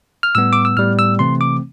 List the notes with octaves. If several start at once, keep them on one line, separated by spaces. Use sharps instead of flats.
F6
A2 G3 B3 E6
D6
E6
A2 G3 B3 F6
E6
C3 E3 A3 C4 C6
D6